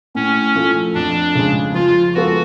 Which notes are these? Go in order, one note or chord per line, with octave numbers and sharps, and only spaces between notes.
A2 C#4
F3 A3
F2 D4
C#3 G#3
F3 F4
G#3 B3 F4 F#4 A4